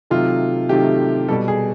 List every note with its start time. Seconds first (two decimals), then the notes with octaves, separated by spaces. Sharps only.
0.10 C3 D#3 F#3 A3 F4
0.69 C3 D#3 F#3 A3 G4
1.28 B2 G3 A4
1.48 G#4